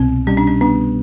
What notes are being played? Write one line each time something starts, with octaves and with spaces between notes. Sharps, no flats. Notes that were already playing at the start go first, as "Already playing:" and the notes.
Already playing: C2 B2 C4
G3 C#4
D4
C#4
B3 D4